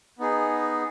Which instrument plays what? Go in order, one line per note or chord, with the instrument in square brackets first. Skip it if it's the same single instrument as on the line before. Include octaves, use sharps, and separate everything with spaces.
[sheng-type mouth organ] B3 D#4 G#4